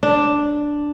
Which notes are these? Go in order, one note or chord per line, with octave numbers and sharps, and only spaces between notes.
D4